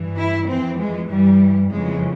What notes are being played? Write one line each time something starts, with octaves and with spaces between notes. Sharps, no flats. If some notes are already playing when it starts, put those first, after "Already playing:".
Already playing: G2 E3
E4
F2 E3 C4
G#3
G2 E3 G3
F2 C#3 E3 G#3